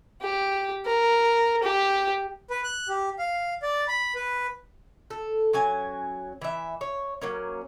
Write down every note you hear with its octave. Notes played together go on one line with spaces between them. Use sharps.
G4
A#4
G4
B4
F#6
G4
F5
D5
B5
B4
A4
F#3 C#4 G#5
E3 E5
C#5
F#3 A#3 C#4